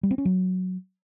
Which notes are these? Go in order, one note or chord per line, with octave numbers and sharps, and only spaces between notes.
G3
C4
C#4
F#3